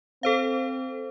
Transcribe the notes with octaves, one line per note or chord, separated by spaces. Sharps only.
C4 A4 C5 F5